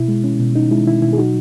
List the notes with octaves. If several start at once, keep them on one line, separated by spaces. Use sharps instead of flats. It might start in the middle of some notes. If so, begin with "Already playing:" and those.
Already playing: B2 E4
G#3
C#4
B2
C#4 D#4
G#3 E4
B2 E4
B2 E4
G#4
F#3 D#4 F#4